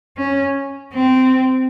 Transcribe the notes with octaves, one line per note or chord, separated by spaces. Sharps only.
C#4
C4